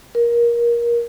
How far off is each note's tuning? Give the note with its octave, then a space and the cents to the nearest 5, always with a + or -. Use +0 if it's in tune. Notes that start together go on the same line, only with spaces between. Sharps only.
A#4 +20